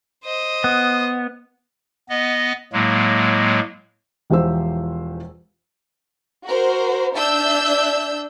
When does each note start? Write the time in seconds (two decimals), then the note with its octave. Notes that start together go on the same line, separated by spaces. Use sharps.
0.24 C5 D#5
0.64 B3
2.09 B3 D#5
2.73 A2 F#3 G#3 A#3
4.30 E1 E2 F3 G4 C5 E6
6.45 F#4 A#4 C5
7.14 D4 E5 E6 G6